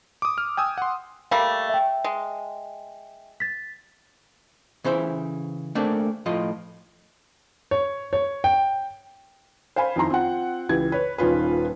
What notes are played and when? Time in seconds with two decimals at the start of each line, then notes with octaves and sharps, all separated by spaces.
0.22 D6 D#6
0.38 F6
0.57 G5 G#5 D#6 E6
0.78 F#5 C6
1.31 G3 A3 A#3 F5
1.70 E5 G5
2.04 G#3
3.40 A6 B6
4.84 C#3 E3 C5 E5
5.75 A3 A#3 C4 D4 G#4
6.26 A2 F3 F4 D#5
7.71 C#5
8.13 C#5
8.44 G5
9.76 C5 F5 G#5 B5
9.96 F2 D#3 E4 F4 A#5 C6
10.10 C4 F4 F#5
10.69 C#2 E3 G4 G#6
10.92 B4 C#5
11.18 D#1 D#3 C#4 F4 B4